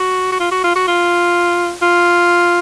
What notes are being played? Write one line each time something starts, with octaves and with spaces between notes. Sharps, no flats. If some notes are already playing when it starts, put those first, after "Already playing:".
Already playing: F#4
F#4
F4
F#4
F4
F#4
F4
F4